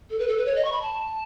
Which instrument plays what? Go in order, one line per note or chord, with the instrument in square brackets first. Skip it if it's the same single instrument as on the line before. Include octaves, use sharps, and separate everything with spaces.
[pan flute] A4
B4
A4
B4
C#5
D#5
C#6
B5
A5